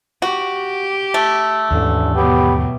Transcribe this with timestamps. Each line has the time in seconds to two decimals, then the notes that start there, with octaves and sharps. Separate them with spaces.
0.22 F#4 G4
1.14 A3
1.71 A1 D#2 G#2 D3 E3
2.15 B2 F#3 B3 G4